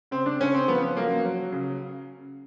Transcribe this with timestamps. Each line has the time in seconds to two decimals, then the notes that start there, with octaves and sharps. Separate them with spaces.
0.11 C#3 C4
0.26 D4
0.40 C#3 C#4
0.54 C4
0.68 F3 B3
0.97 F#3 A#3
1.25 F#3
1.52 C#3